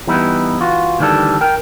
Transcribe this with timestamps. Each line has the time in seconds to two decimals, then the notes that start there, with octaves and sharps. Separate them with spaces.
0.07 E3 G3 B3 D#4 E4
0.60 E3 F4 F#4
0.99 D2 D#3 E3 G3 D4 A4
1.41 A#4 G5